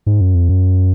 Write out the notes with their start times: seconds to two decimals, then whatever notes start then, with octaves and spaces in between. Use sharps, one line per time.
0.07 G#2
0.21 F#2
0.35 F2
0.49 F#2